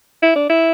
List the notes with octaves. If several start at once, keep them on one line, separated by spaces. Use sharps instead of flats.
E4
D4
E4